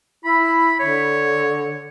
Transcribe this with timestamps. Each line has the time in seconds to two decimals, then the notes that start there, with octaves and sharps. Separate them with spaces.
0.24 E4 B5
0.80 D3 C#5